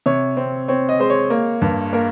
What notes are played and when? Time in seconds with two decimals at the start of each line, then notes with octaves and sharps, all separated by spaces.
0.06 C3 C#5
0.37 C4
0.68 C4 C#5
0.89 D#5
0.99 G#3 C5
1.10 C#5
1.30 A#3
1.62 G2
1.93 A#3 A#4